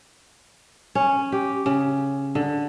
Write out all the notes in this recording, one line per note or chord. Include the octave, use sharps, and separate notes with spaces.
C#4
G4
C#3
D3